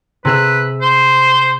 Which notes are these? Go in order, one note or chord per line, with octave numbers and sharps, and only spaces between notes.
C3 G#4 B4 E6
C5